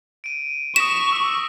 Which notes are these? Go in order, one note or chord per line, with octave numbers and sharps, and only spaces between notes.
D7 D#7
C#6 D#6 A#6 B6 E7
D6 E6